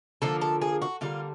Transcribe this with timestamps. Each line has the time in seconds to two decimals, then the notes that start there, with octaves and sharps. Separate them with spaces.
0.22 D3 F3 A#3 A4
0.41 A4
0.62 G#4
0.82 F#4
1.01 D3 G3 A#3 F4